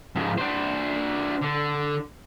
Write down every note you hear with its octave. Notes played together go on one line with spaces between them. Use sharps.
G#2 F3
D4 C5
D3